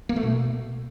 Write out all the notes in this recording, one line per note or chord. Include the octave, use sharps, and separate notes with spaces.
A#3
A3
B2